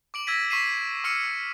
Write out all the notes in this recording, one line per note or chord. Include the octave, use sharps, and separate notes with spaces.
D6 D7 F#7
E6 G#6 A#6 B6 D#7
C#6 B6 C7 D#7 E7
C#6 E6 F6 C#7 D#7